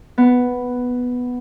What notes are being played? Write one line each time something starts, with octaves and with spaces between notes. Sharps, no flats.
B3